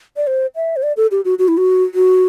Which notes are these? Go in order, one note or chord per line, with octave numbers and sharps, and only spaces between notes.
D5
C5
E5
C5
D5
A4
G4
F#4
F#4
E4
F#4
F#4